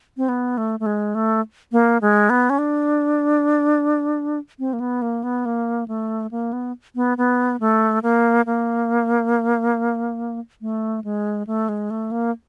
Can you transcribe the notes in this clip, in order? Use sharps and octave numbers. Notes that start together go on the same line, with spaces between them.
C4
B3
A3
A3
G#3
A3
A#3
G#3
B3
C#4
D4
C4
A#3
B3
A#3
B3
A#3
A3
A#3
B3
B3
B3
A3
A#3
A#3
A3
G#3
A3
G#3
A3
A#3